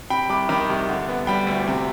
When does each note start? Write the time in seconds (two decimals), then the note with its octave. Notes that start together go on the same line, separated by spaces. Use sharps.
0.10 C3 G5 B5
0.29 C2 B5 D6
0.49 D#3 B5 D6
0.70 C2
0.89 D3
1.08 B3
1.27 G3 G5 B5
1.47 D2
1.68 C3